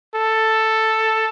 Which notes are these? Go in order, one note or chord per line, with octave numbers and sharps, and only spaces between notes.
A4